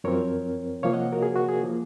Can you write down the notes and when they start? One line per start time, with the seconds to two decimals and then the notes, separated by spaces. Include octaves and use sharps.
0.04 F#2 F3 C4 A#4 C#5
0.83 C3 F3 A#3 C#5 F5
0.93 D#5 F#5
1.12 F#4 A#4
1.22 G#4
1.36 F#4
1.49 G#4
1.63 F3 A#3